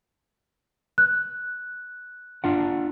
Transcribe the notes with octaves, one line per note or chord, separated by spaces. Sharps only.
F#6
D4 F4 F#5